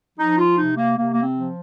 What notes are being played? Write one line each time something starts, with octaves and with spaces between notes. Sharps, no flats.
F3 D#4
F4
C3 D#4
A#3
C3 A#3
A#3
C4
F3